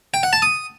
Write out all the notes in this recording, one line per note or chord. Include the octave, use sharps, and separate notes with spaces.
G5
F#5
A5
D#6